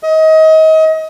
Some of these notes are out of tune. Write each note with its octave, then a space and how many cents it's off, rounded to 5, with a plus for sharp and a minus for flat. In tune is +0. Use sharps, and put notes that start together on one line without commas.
D#5 +30